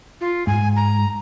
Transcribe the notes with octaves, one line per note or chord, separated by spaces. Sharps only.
F4
G#2 G#5
A#5